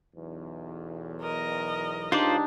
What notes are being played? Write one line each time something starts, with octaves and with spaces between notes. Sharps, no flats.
B1 E2
A#4 D#5
C#2 D4 D#4 F4 G4 C5 D5